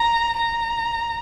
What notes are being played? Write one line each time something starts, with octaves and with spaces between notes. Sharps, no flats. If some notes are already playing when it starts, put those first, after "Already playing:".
Already playing: A#5
A#5